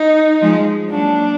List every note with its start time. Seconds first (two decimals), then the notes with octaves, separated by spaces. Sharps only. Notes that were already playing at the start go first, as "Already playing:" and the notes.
Already playing: D#4
0.42 F3 G#3
0.90 F#3 A#3 D4